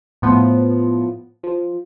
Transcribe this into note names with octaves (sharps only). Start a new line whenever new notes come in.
A2 F3 B3
F3